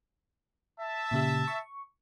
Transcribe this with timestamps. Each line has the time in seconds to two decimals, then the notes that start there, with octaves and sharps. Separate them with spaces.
0.80 E5 A5
1.11 A#2 C#3 G4
1.48 C#6